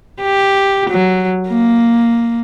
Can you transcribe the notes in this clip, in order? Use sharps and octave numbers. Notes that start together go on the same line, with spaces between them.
G4
F#3
A#3